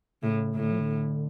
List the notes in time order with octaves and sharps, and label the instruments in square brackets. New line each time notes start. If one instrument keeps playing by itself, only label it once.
[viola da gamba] A2 [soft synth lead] C#3
[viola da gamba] A2 [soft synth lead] C#3
[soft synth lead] D3
F3
D3